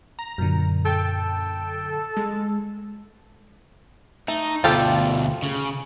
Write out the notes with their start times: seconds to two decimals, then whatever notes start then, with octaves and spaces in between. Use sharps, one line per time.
0.19 A#5
0.38 F#2 A#2 D3
0.85 A4 G5
2.17 G#3
4.28 A3 D#4
4.64 D2 B2 F4 G4 A4
5.43 C#3